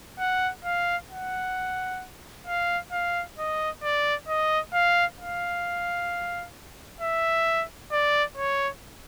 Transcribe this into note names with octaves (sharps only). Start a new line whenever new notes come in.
F#5
F5
F#5
F5
F5
D#5
D5
D#5
F5
F5
E5
D5
C#5